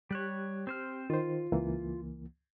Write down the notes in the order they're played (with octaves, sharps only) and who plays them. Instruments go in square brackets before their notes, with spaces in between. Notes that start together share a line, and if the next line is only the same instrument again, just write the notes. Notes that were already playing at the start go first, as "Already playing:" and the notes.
[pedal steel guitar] G3 C#5 [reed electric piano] G4 F#6
[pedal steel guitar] C4 C5 F6
[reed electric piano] D#3 C5 [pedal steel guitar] F4
[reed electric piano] C#2 E3 A#3